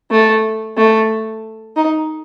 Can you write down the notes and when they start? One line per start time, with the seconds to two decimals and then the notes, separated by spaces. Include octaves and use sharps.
0.11 A3
0.77 A3
1.77 D#4